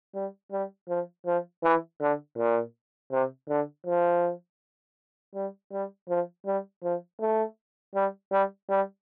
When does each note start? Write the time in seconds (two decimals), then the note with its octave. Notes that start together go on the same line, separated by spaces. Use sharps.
0.15 G3
0.52 G3
0.89 F3
1.26 F3
1.63 E3
2.01 D3
2.38 A#2
3.12 C3
3.49 D3
3.87 F3
5.35 G3
5.72 G3
6.09 F3
6.46 G3
6.84 F3
7.21 A3
7.95 G3
8.32 G3
8.69 G3